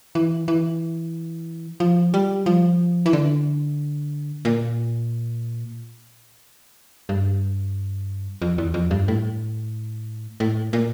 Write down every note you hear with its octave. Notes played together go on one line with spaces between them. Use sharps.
E3
E3
F3
G3
F3
E3
D3
A#2
G2
F2
E2
F2
G2
A2
A2
A#2